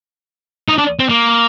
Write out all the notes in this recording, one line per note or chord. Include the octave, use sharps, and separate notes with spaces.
D#4
D4
C4
A#3